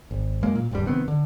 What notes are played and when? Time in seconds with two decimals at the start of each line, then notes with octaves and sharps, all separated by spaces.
0.11 G#1
0.43 F#2 G#3 A#3
0.55 A#2
0.71 D1 G2 D3 G3
0.85 F1 D#3 B3 C4
1.08 D3